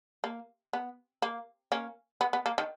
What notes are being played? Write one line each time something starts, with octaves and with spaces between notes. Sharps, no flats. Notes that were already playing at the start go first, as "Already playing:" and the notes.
A#3
B3
A#3
A#3 C#4
B3
B3
A#3
D#3